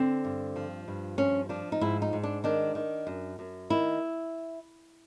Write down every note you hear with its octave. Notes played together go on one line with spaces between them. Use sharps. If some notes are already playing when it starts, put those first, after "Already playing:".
Already playing: D3 C4
G2
F3
G2
F3 C#4
F3 D4
D#4
G#2 E4
D#4
G#2
D4
D#3 D4
D#3
F#2
F#2
D#3 E4